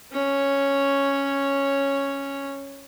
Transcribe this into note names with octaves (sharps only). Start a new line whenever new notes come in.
C#4 C#5